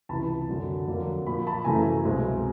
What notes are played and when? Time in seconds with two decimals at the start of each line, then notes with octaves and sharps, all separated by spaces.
0.09 C#2 C3 E3 A5 B5
0.49 F#2 D3 F#3
0.87 F2 D3 F#3 A#3
1.26 A#2 F3 A#3 B5
1.47 A5 B5
1.65 F#2 C#3 E3 A3 G#5 A#5
2.04 C2 B2 G#3 C4